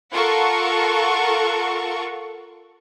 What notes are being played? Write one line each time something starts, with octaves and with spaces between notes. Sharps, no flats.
F4 A4 A#4 F#5 C#6